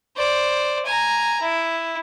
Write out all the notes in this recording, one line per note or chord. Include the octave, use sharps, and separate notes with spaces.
C5 D5
G#5 A#5
E4